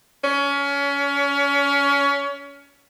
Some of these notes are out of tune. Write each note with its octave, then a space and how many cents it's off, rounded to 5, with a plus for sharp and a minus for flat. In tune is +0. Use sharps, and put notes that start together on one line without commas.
C#4 +25